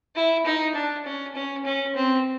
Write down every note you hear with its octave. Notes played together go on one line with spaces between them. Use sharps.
E4
D#4
D4
C#4
C#4
C#4
C4